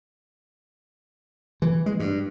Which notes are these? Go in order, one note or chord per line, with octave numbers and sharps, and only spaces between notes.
E3
G#3
G2